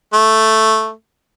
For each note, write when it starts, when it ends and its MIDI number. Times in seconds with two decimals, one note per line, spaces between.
0.13 0.92 57